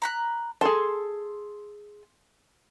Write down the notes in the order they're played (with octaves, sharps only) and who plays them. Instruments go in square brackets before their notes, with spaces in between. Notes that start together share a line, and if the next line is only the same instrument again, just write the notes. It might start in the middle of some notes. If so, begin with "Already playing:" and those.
[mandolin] A#5 B5 F#6
[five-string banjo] G#4 A4 A5 [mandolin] C6 E6